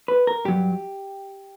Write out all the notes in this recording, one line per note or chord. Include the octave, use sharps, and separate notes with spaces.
B4
A#4
G2 F#3 G4